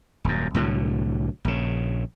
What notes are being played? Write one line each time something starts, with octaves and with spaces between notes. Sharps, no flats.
D#1 F#2
C2 A2 D3 F#3
A#1 C#3